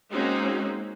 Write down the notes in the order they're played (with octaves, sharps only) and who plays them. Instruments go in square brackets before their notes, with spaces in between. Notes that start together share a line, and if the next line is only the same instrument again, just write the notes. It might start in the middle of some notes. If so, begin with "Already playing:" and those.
[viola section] G#3 A#3 C4 C#4 D#4 F#4